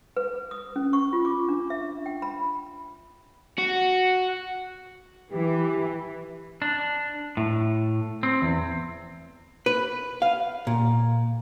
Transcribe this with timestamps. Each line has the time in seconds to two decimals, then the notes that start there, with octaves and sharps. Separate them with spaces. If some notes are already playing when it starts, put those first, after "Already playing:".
0.17 B4
0.51 D#6
0.76 C#4
0.93 C#6
1.13 F4
1.25 D6
1.48 D4
1.70 E5
2.06 G5
2.22 B5
3.58 F#4
5.33 E3 G4
6.62 D4
7.37 A2
8.23 C4
8.42 E2
9.66 B4
10.22 F5
10.67 A#2